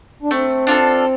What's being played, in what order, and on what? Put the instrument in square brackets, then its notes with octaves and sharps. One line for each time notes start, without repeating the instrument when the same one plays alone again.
[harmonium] D4
[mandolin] A3 [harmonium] C4
[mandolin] D4 F4 A4